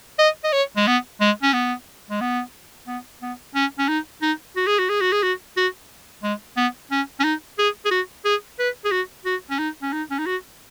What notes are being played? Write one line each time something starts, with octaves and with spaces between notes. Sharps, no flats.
D#5
D#5
C#5
G#3
B3
G#3
C#4
B3
G#3
B3
B3
B3
C#4
C#4
D#4
D#4
F#4
G#4
F#4
G#4
F#4
G#4
F#4
F#4
G#3
B3
C#4
C#4
D#4
G#4
G#4
F#4
G#4
B4
G#4
F#4
F#4
C#4
D#4
C#4
D#4
C#4
D#4
F#4